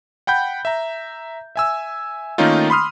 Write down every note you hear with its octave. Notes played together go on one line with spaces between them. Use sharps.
F#5 G5 B5 G6
E5 A#5
E5 G#5 E6
D#3 A3 A#3 C#4 D#4 F4
B5 C6 D#6 F6